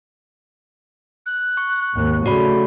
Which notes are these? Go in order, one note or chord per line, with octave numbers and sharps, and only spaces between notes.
F#6
C#6
G#1 D#2
C#3 A3 F#4 D5 B5